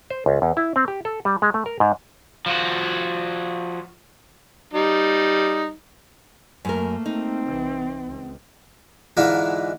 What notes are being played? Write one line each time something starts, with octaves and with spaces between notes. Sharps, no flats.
C5
C#2
E2
E4
C4
G4
A4
G3
G#3
A3
A#4
G#2
F3 F#4
G3 D#4
F#2 A3 A#3 A#4
C4 D#4
C2 E3
C#2
G#2 D3 E3 D4 E4 F4